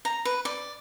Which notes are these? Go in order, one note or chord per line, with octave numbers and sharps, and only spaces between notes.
A#5
B4
D5